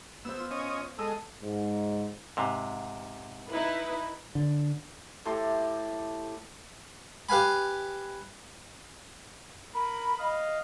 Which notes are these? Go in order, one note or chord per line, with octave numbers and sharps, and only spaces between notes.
B3 C5 E6
F4
C#4 D#5
G#3 A4 D#5 E6
G#2
G#2 C3
D#4 E4 B4
D3
A2 G4 A4 C6
G4 B4 F5 G#5 B5
A#4 B5
D#5 F5